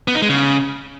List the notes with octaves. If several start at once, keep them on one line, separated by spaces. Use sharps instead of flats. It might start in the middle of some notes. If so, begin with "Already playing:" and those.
B3
D#4
G#3
C#3